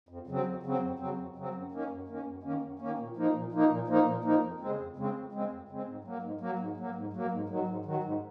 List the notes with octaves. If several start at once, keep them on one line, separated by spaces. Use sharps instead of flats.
F2
C#3 F#3 C4
F2
C#3 F#3 C4
F2
C#3 F#3 C4
F2
C#3 F#3 C4
F#2
D#3 A#3 C#4
F#2
D#3 A#3 C#4
F#2
D#3 A#3 C#4
F#2
D#3 A#3 C#4
A#2
F3 A#3 D#4
A#2
F3 A#3 D#4
A#2
F3 A#3 D#4
A#2
F3 A#3 D#4
F2
C#3 G#3 C4
F2
C#3 G#3 C4
F2
C#3 G#3 C4
F2
C#3 G#3 C4
G#2
F#3 A#3
G#2
F#3 A#3
G#2
F#3 A#3
G#2
F#3 A#3
G#2
D#3 F#3
G#2
D#3 F#3
G#2